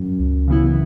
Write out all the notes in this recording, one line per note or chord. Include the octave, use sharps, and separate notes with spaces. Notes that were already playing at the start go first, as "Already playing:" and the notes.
Already playing: F#2
C#2
C#3 E3 B3 E4